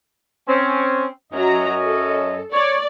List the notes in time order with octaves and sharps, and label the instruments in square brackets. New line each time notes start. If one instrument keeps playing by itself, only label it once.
[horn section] C4 C#4
[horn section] F#2 C#4 D#5 [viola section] F#3 A#5
[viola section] A4
[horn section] C#5 [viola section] D5